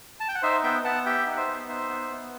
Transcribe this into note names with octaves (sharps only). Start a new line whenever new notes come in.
A5
G5
F#5
D#4 C5 E5
B3 E5 G5
B3 F#5 A5
G4 E5 G5
D#4
F#5
C5 E5
B3
D#4 C5 E5
B3
B3